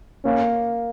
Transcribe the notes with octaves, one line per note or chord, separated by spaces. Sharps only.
A#3 C#4